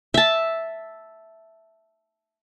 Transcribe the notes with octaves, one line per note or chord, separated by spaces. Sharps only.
E5 A5